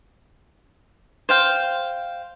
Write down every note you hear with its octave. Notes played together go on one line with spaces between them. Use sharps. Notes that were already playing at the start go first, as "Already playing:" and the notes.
C5 F5 G5